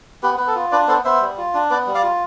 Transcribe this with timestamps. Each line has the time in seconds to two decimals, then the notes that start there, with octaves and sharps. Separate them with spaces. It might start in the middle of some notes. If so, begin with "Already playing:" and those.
0.23 B3 G4 B4
0.37 B3 B4
0.47 A4
0.55 F4
0.72 D4 B4 D5
0.88 B3 A4 C5
1.05 B3 C5 E5
1.21 G3
1.38 F4
1.54 D4
1.70 B3 B4 D5
1.87 G3
1.95 D5 F5
2.03 F4